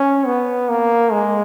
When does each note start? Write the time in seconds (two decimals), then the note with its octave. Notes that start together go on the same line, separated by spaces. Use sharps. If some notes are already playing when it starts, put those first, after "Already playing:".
Already playing: C#4
0.26 B3
0.69 A#3
1.12 G#3